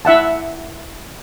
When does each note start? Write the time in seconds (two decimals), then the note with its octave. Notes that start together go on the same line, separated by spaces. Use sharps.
0.05 E4 E5 F#5 A5